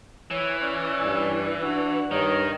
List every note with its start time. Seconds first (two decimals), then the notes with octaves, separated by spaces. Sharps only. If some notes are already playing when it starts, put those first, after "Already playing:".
0.31 E3 C#5
0.62 C#4 D5
1.02 G2
1.62 D4 F#4
2.11 G2 D#3 D#4 C#5